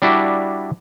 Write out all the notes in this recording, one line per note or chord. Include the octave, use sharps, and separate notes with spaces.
G3 D4 E4 F#4